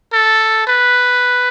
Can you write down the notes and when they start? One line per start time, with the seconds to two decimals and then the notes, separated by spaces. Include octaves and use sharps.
0.13 A4
0.67 B4